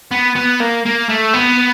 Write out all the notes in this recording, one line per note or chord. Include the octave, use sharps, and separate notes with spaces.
B3
B3
A#3
A#3
A3
B3